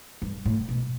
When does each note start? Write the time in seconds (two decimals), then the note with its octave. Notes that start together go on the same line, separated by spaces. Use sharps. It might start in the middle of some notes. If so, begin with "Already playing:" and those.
0.22 G2
0.45 A2
0.69 B2